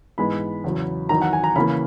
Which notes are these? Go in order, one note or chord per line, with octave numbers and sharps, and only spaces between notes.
G#2 E3 G#3 B3 B5
E2 C#3 F#3
E2 D#3 F#3 A#5
F#5
G#5
A#5
C#3 E3 A#3 B5